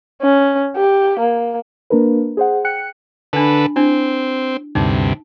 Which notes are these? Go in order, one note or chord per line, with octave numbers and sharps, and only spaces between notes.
C#4
G4
A#3
A#3 D4 A#4 B4
G#4 C5 F#5
G5 F#6 C#7
D3 D4 A4 B4 B5
C4 D4 E4
D2 G2 C3 D#4